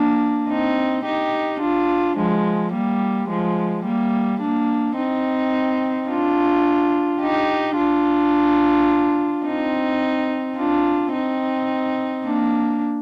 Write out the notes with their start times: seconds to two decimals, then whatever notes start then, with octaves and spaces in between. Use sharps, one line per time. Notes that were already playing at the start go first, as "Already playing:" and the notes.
Already playing: A#3 D4
0.49 C4 D#4
1.05 D#4 G4
1.60 D4 F4
2.16 F3 G#3
2.73 G3 A#3
3.29 F3 G#3
3.85 G3 A#3
4.41 A#3 D4
4.97 C4 D#4
6.09 D4 F4
7.21 D#4 G4
7.77 D4 F4
9.45 C4 D#4
10.57 D4 F4
11.13 C4 D#4
12.24 A#3 D4